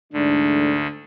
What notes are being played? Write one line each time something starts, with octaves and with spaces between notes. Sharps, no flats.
D2 G#2 D3 E3 A3 D4